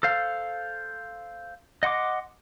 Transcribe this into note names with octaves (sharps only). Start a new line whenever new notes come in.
A4 C5 F5
D#5 F#5 C6 D6